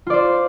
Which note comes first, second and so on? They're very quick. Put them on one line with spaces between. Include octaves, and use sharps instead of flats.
F4 D5 C5